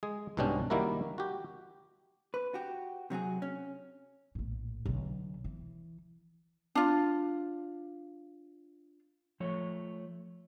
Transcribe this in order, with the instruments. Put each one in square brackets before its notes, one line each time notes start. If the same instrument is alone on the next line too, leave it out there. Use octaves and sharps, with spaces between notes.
[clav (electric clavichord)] G#3 G#4
C2 G#2 B2 C#4 D4 G4
D#3 G3 A#3 E4 F#4 A#4
F#4 G4
[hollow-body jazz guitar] B4
F#4 G4
C3 F#3 F#4 G#4
C#4
[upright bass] A#1 A2
B1 D3
E3
[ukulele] D4 F4
[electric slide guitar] F3 A3 C#5